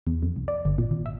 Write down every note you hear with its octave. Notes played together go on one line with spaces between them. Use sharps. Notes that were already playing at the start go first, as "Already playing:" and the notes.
E2
F2
C2
D5
G1
A#2
G#1
E5